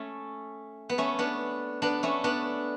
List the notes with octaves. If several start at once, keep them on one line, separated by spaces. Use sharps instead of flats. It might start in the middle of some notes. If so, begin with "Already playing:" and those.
Already playing: A3 C#4
B3
A3 C#4
B3 D4
B3 D4
A3 C#4
B3 D4